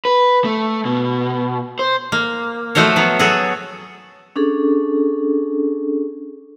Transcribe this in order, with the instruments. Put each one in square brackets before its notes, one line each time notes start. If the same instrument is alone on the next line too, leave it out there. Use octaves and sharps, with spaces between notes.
[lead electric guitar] B4
A3
B2
C5
[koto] A#3
F3 A3 F#4 C5 C#5
F#3 B3
F#3 F#4 G#4 A4
[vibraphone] C#4 D4 G#4 A4